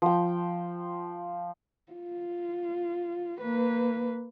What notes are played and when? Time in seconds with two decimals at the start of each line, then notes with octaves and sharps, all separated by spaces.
0.02 F3 G5
1.92 F4
3.41 A#3 B4